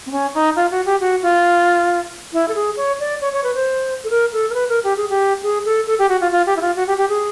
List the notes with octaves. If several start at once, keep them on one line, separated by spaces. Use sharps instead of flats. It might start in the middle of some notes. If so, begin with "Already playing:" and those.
C4
C#4
D#4
F4
F#4
G4
F#4
F4
E4
A4
G#4
C#5
D5
C#5
C#5
B4
C5
A4
A#4
A4
A#4
B4
A#4
G4
G#4
G4
G#4
A4
A4
G4
F#4
F4
F4
G4
E4
F4
F#4
G4
G4
G#4